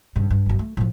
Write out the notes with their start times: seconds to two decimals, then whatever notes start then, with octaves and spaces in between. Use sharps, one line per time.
0.16 G2 C#3
0.31 G2
0.46 G1 F#2
0.59 A3
0.77 A2 F3